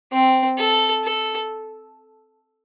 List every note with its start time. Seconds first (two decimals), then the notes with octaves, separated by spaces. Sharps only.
0.12 C4
0.58 A4
1.04 A4